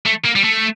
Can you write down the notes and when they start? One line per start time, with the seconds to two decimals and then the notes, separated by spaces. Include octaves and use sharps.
0.06 A3
0.25 A#3
0.36 G3
0.44 A3